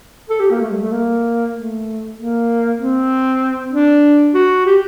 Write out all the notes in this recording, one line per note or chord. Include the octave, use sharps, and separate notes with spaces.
A4
G4
A#3
A3
G3
A3
A#3
A3
A#3
C4
D4
F#4
G4